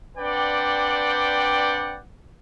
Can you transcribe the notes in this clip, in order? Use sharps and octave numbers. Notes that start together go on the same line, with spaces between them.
C4 D4 B4 D5 F#5 G5